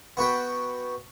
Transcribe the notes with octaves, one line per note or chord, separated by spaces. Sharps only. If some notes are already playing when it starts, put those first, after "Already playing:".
B3 F#4 B4 G5